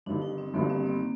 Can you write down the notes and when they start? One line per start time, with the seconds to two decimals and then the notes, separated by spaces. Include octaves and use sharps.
0.06 G1 G2 D#3 D4
0.22 D#4
0.38 C4
0.54 G1 G2 D#3 A#3
0.70 C4
0.86 A#3